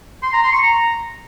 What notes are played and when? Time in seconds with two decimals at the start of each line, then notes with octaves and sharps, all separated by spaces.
0.23 C6
0.33 A#5
0.42 C6
0.52 C#6
0.62 A#5